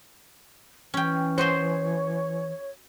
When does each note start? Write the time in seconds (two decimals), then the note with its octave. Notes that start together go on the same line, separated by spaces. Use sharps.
0.94 E3 C#4 G5
1.38 F#4 C5 C#5 D#5 C6